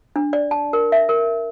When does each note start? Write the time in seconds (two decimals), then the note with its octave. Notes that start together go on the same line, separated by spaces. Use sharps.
0.16 D4
0.33 D5
0.51 A5
0.73 A#4
0.92 E5
1.09 A#4